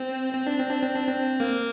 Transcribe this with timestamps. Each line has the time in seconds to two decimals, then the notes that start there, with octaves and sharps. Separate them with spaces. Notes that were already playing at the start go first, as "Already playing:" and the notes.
Already playing: C4
0.34 C4
0.47 D4
0.59 C4
0.70 D4
0.83 C4
0.95 D4
1.07 C4
1.40 A#3